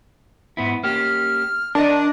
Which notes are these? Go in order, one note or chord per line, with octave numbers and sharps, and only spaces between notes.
G#2 B3 E4
A#3 C#4 G4 F6
D4 A#4 D#5